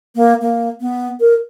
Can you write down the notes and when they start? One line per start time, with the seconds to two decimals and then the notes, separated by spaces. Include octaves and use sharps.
0.15 A#3
0.41 A#3
0.80 B3
1.20 A#4